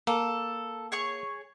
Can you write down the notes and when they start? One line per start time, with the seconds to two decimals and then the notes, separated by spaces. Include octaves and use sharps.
0.07 A#3 A4
0.92 G#4 C#5 C#6